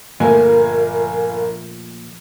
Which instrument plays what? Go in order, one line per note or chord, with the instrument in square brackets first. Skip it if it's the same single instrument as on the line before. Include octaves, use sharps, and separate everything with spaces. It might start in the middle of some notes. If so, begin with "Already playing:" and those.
[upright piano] G1 A#3 G#5 [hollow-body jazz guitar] A#2 F3 A3 [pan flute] A#4